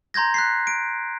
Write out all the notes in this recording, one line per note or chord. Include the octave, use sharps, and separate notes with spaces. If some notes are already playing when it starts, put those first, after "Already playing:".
A#5 C6 G6 G#6 A#6
F#6 B6 C7
D7